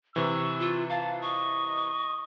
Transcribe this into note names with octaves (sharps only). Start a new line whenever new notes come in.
C3 E3 C#6 E6
F4
F5 A5
D#5 C#6
D#5